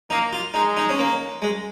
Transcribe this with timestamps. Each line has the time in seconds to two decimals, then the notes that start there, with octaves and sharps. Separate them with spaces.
0.10 A#3 D#4
0.33 F4
0.54 G#3 D#4
0.77 D#4
0.89 C#4
0.99 A#3
1.42 G#3